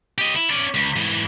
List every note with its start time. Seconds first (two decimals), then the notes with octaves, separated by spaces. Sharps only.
0.18 G4 D#5
0.36 E4
0.50 C#4 D5
0.74 C#2
0.96 G#2 E3